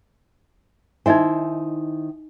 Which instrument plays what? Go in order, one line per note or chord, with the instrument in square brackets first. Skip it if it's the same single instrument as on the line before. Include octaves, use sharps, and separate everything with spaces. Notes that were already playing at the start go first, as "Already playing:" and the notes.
[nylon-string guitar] D#3 E4 C5 [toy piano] D#4 D#5 G#5